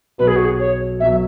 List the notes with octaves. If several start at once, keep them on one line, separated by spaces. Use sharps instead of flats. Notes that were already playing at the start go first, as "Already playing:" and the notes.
B1 B2 F#3 B4
G#4
F#4
G#4
C#5
B1 B2 F#3 E5